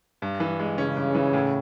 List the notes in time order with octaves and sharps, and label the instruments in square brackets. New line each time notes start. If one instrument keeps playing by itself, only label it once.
[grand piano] G2
E3
G#3
[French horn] C#3 [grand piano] C#4
[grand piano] G2
E3
A2